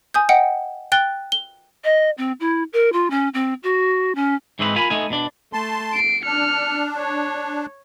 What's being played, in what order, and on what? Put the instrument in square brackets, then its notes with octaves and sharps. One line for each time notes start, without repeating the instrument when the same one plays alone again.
[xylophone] G#5 D#6 G6
D#5 F#5 G5 C#7
G5 F#6 A6 G7
G7
[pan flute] D#5
C4
E4
A#4
F4
C#4
C4
F#4
C#4
[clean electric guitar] G#2 E3 C4 D#4 F4 B4
F4 A#4 G#5 B5
A3 B3 D#4 G#5
B2 D4
[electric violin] A3 [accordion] A5 C6
[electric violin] C7 D7
[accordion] D4 [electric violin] F6 C#7
[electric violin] C#5